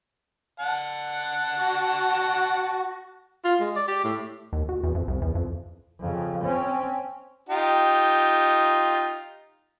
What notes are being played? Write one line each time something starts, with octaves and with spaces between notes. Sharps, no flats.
F#5 A5
F#4
F4
G#3
D5
G4
A2
D#2
F#4
E2
F2
C2
E2
F2
F2 C#3
C4 C#4
D#4 F4 G4